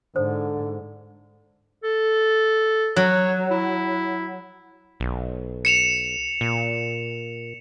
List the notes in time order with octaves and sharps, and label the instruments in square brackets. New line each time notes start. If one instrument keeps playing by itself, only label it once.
[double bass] G#2 [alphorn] D3 [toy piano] A4 C5
[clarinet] A4
[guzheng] F#3 [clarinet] C#5
[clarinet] E4
[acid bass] B1
[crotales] C#7 E7 F7
[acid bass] A#2